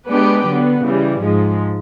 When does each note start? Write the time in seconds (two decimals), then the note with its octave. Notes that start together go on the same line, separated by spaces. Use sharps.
0.08 G#3 B3 D4 G4 B4
0.45 D3 F#3 B3
0.82 C#3 E3 G3
1.19 G#2 F3 G#3